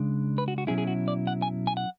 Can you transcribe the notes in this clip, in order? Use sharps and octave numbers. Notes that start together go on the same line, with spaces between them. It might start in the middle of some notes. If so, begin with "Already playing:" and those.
Already playing: C#3 G#3 D4
B4
F#4
F#4
B2 F#3 C#4 E4 G#4
G#4
F#4
D5
F#5
G#5
G#5
F#5